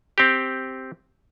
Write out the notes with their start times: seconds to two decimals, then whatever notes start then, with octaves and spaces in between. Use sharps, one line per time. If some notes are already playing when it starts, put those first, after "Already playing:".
0.18 C4 G4